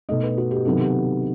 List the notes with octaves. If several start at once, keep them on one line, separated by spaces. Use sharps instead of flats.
B2 A3 D#4 D#5
B4
F#4
G4
C3 D#3 F#3 B3 A4
G4